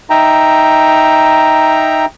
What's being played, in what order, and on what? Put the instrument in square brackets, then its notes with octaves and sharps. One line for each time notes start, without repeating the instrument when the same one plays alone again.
[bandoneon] D#4 E5 G5 A#5